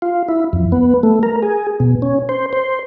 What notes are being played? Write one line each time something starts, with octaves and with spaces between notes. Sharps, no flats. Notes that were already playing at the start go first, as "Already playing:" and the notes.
F4
E4
F2
B3
A3
A#4
G#4
B2
C#4
C5
C5